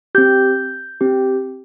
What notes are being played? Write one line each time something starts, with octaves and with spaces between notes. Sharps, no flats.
C4 G4 G6
C4 G4